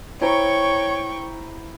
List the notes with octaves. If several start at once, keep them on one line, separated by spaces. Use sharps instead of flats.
E4 C5 C#5 G5 A#5 C#6